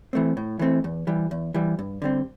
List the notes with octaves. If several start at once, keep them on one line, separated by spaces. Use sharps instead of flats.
E3 A3 C4
A2
E3 A3 C4
E2
E3 G3
E2
E3 G3
G2
D3 G3 C4